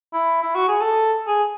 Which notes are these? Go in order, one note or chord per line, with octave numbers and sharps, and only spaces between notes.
E4
E4
F#4
G#4
A4
G#4